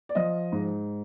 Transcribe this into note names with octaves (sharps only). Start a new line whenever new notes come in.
D5
F3 D#5
G#2